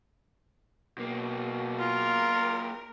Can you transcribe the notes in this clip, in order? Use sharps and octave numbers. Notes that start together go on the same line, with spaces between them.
F#2 B2 A#3
F4 A#4